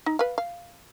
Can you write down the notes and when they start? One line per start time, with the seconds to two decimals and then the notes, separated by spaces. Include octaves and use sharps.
0.06 D#4
0.19 B4 F5
0.38 F5